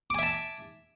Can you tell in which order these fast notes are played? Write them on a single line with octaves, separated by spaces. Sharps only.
D6 G#5 E5 A5